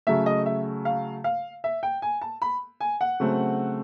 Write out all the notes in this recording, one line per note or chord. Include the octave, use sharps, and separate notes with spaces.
C#3 F#3 A3 E5
D#5
E5
F5
F5
E5
G5
G#5
A5
B5
G#5
F#5
C#3 F#3 A3 C4